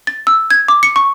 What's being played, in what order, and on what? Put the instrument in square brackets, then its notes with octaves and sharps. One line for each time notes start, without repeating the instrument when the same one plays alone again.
[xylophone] A6
E6
G#6
D6
C#7
C#6